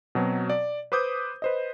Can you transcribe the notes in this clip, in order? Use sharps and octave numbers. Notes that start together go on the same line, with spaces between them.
B2 F#3 C4
D5
B4 C5 D6 D#6 G6
B4 C5 D#5